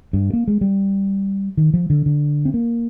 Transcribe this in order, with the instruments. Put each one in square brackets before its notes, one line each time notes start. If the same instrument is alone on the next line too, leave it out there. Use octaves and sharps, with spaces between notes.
[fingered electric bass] G2
A#3
G#3
G3
D#3
F3
D3
D3
C4
A#3